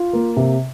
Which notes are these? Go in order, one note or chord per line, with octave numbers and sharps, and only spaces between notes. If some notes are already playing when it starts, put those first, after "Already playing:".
Already playing: F4
A#3
C3